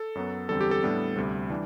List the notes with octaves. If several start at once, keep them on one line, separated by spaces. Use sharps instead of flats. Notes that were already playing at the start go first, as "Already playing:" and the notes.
Already playing: A4
F#2 F#3 B3
E2 D3 G3 C4 A4
G4
A4
A2 G3 B3 D4
D2 C3 G3 C4
E3 G3 D4